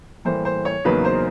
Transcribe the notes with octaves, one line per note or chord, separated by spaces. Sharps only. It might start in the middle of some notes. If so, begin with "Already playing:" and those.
A2 E3 G3 A#3 C5
C5
C#5
E2 C#3 F#3 A#3 D#4 B4
C5